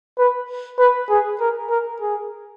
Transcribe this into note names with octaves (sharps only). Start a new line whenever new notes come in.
B4
B4
G#4
A#4
A#4
G#4